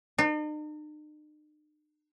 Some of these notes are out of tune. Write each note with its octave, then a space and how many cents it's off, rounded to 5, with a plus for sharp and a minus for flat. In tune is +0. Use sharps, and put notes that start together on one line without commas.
D#4 -45